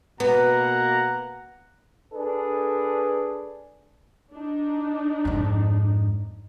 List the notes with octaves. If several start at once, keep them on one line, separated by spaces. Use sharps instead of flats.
B2 A#3 B3 F#5 A#5
D4 G#4 A4 B4
D4 D#4
F2 G#2